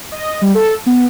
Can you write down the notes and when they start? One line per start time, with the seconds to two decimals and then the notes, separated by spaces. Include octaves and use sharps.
0.12 D#5
0.42 G3
0.55 A4
0.86 B3